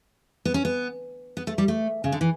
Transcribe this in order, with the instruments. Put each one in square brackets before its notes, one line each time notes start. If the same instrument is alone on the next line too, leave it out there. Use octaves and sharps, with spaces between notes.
[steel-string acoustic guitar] B3
C#4
B3
B3
A3
G3
A3
C#3
D3
E3